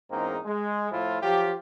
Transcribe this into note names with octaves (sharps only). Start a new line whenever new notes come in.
E2 G#2 A#3 C4 C#4 D#4
G#3
A2 F3 E4 F4
F3 F#3 F4 G4